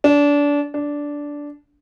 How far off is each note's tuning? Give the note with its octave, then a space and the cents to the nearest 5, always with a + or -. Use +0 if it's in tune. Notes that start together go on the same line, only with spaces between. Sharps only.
D4 -25
D4 -10